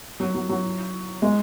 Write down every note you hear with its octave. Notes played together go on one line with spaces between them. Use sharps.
F#3
F#3
F#3
G#3